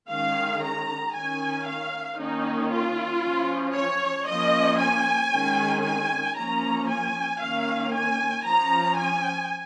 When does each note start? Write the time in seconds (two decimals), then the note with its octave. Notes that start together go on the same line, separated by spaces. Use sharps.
0.10 D#3 G#3 C#4 F5
0.62 A#5
1.14 D#3 C#4 G#5
1.67 F5
2.19 D#3 A#3 C#4 D#4
2.72 F4
3.24 F3 C#4
3.75 C#5
4.28 F3 A#3 C#4 D#5
4.80 G#5
5.32 D#3 G#3 C#4
5.84 G#5
6.36 F3 A#3 C#4 A#5
6.88 G#5
7.41 D#3 A#3 C#4 F5
7.93 G#5
8.45 F3 C#4 A#5
8.97 G#5